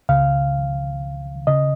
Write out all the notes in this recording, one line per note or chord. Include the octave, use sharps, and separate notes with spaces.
C#2 C#3 F5
C#3 D#5